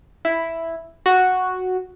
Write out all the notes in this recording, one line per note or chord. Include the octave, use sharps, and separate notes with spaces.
E4
F#4